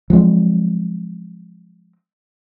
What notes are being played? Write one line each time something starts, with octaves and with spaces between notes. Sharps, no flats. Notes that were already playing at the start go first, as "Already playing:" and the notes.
F3 F#3 G#3 C4